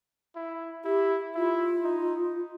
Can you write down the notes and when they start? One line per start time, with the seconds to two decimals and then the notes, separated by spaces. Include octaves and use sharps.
0.36 E4
0.85 E4 G4
1.35 E4 F4
1.84 D#4